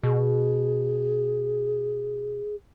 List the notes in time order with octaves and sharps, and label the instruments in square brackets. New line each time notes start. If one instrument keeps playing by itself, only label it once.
[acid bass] B2 [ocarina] G#4